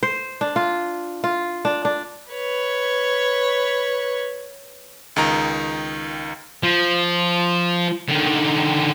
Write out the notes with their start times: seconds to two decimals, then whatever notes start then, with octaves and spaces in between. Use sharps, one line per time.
0.03 C5
0.41 D4
0.56 F4
1.24 F4
1.65 D4
1.85 D4
2.32 B4 C#5
5.16 C#2 D#3 A#5
6.63 F3
8.08 D3 D#3